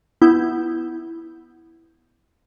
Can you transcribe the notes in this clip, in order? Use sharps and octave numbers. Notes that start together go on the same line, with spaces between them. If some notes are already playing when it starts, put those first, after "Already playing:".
B3 E4 G6